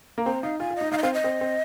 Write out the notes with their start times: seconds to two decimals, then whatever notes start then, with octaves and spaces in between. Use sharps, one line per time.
0.18 A#3
0.26 C4 A#5
0.43 D#4 F5
0.59 F4 G#5
0.70 F4
0.76 D#4 D#5
0.92 D#4 F5
0.98 D#5
1.03 C4 F5
1.14 D#5
1.24 C4
1.41 C4